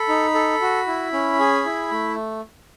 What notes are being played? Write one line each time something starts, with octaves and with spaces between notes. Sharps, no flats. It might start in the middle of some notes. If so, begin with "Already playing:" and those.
Already playing: A4 B5
D#4
A4
F#4
E4
C#4
G#4
E4
A3